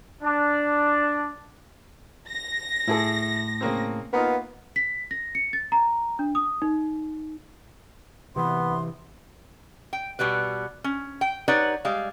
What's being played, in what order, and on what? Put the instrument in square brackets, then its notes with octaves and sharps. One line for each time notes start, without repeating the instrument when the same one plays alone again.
[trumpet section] D4
[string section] A#6
[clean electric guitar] A2 [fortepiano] E4 G#4 A4
[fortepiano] C#3 A#3 C4
[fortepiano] A#3 D#4 F4 [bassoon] B3
[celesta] B6
A#6
C#7
A6
A#5
D4
D#6
D#4
[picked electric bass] C3 E3 [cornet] B3 [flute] C6
[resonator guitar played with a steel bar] G5
B2 G3 B3 B4
C#4
G5
D#4 G4 B4 C#5 D5 F#5
G3 G#3 F5